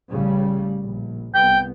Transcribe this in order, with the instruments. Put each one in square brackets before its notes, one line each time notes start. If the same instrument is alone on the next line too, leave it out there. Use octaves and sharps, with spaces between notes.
[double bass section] A1 C#3 G3
A#1
[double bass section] C2 B3 [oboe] G5